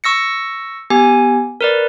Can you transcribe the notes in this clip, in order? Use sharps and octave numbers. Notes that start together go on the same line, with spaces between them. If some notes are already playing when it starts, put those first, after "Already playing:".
C#6 E6 A#6 C#7
B3 G4 G#5
A#4 B4 D5